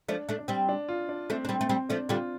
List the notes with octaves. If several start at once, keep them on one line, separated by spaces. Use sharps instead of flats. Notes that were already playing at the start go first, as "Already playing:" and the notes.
F3 A3 D4
A3 D4
D4
G3 C4
D4
F4
D4
A3 C4 D4
D4
G3 C4
A3 C4
G3 C4
F3 A3 D4
D3 G3 F4